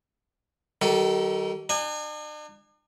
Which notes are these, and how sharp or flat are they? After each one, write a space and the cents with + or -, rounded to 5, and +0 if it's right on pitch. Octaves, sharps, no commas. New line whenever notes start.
D#3 +0 G3 -40 A4 +0
D4 +45 G#5 -25